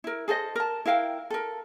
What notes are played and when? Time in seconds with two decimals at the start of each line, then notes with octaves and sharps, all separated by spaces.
0.04 E4 A#4
0.28 G#4 A4 C5 D#5
0.55 A#4 A5
0.86 E4 A#4 F5 G5
1.30 A4 A#4